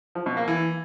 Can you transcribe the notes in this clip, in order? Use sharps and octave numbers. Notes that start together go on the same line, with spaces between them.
F3
B2
A#3
E3